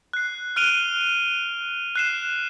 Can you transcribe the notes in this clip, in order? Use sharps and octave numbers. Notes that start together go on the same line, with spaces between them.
F#6 C7
F6 F#6 D7 D#7 F7 G7
F#6 C7 E7